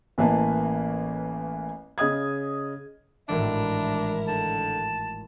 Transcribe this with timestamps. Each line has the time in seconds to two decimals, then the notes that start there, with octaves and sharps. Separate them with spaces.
0.18 A1 E3 A#3 B4 A5
1.98 C#3 D#5 D#6 G#6
3.29 G#1 A2 E3 D4 E4 A#4
4.28 D3 A5